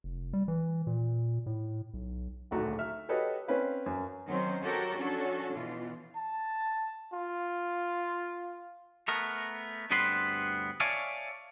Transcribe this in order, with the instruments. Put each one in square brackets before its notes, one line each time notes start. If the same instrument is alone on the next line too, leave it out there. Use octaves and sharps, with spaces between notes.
[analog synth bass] F1
G3
E3
A#2
A2
B1
[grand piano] D1 A#1 D#2 A3 F#4 A#5
E5 F6
F#4 G4 A4 B4 C#5 D#5
C4 C#4 B4 F5
F#2
[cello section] D#3 F#3 C4 C#4 C5
F#4 G4 A4 A#4 C#5
F3 C#4 D4 F#4 A4 C#5
B2 E3 F4
[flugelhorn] A5
F4
[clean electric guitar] A3 B3 A#4
D2 G2 B3 C4 B4 C6
C#5 D5 E5 F5 G#5 A5